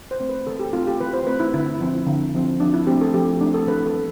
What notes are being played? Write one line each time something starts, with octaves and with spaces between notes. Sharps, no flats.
C5
A3 C4
B4
E3 A4
G4
A3 C4 F4
G4
E3 B4
C5
A3 C4 B4
E4
D3 E4
F3 C4
D3
F3 C4
F3 D4
E4
A3 C4 G4
A4
F3 G4
A3 C4 D4
A4
E3 B4
A4
G3 B3